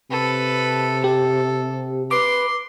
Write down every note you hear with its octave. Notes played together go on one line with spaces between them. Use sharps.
C3 A4 B4
G4 A4
B4 C6 D6